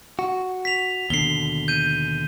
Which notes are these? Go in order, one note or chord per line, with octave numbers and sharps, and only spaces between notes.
F#4
B6 F7
D#2 B2 D3 C7 G7
G6 D#7